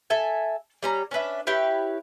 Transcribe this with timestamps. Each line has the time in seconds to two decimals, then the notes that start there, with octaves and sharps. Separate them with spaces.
0.10 A4 E5 G#5
0.83 G3 C#4 A#5
1.11 C#4 D4 B4 E5
1.47 E4 G4 B4 C#5